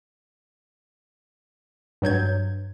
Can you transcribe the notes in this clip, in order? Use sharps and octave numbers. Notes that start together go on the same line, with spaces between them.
G2 F#3 G6 G#6